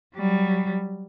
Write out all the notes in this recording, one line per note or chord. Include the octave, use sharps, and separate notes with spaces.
F#3 G3